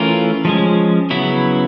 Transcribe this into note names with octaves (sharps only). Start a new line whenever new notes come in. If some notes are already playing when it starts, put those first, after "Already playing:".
Already playing: E3 A3 C#4 F4 A#4
F3 G#3 C#4
C#3 F#3 B3 E4